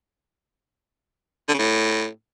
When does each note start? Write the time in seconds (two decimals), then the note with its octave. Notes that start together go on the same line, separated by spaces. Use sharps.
1.48 D3
1.54 C#3
1.59 A2